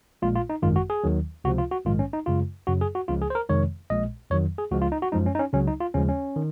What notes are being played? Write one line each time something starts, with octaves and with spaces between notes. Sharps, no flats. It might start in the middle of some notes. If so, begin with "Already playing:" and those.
A#1 A#2 G#3 F4
F4
D#4
G#1 F#2 D#3 G#3 F4
F#4
G#4
D#2 D#3 F#3
C#2 C3 F3 F#4
F4
F#4
A#1 G#2 D#3 G#3 F4
C#4
D#4
F#2 C#3 G#3 F4
F#2 C#3 F#3 F#4
G#4
F#4
C#2 C#3 F3 G#3 F4
G#4
C5
A#4
F2 C3 D#3 G#3 C#5
A#1 A#2 G#3 D#5
F2 D#3 F#3 C#5
G#4
C#2 C#3 F3 G#3 F#4
F4
D#4
F#4
F#2 F3 G#3 D#4
C#4
D#4
C#4
C#2 C#3 F#3 C#4
D#4
F4
D#2 C#3 F3 G#3 C#4
C#4
D#3